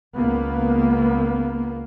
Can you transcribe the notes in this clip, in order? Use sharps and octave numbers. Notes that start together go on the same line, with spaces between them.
C#2 A#3 B3